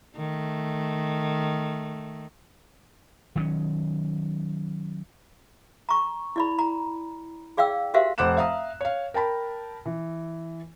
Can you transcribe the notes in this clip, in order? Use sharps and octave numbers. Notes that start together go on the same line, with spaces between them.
D#3 A3
D#3 F#3 C#4
A#5 C#6
E4 D5 B5
A#5
G#4 D5 F5 G5 E6
F#4 G4 A#4 C5 E5 F5
F1 C5 F#5 D6 F#6 E7
E5 F5 A#5 D#6
C#5 F5
A#4 G5 A5 B5
E3